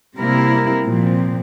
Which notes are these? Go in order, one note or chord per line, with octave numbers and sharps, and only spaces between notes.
C3 G3 A#3 E4 A#4
A#2 F3 C4